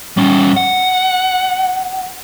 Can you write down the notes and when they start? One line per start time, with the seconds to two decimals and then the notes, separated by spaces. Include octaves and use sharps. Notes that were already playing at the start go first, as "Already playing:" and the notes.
0.17 G3 C#4
0.57 F#5